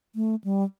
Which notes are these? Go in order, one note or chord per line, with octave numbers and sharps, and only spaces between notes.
A3
G3